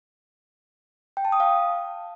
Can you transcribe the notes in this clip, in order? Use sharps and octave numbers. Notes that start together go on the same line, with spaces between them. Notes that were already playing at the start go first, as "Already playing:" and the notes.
G5
A5
D#6
F5